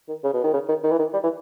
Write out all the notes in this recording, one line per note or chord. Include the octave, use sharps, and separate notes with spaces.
D#3
C#3
B2
D#3
C#3
D#3
D#3
E3
D#3
G3
E3